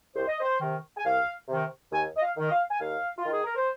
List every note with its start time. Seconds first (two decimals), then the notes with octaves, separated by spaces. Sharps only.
0.15 C2 C5
0.28 D#5
0.40 C5
0.59 C3 D#3
0.97 G#5
1.04 C2 F5
1.48 C3 D#3
1.92 D#2 G#5
2.17 D#5
2.22 F5
2.37 D#3
2.46 D#5
2.51 F5
2.70 G#5
2.80 D#2 F5
3.18 F4
3.25 D#3
3.31 G#4
3.44 A#4
3.56 C5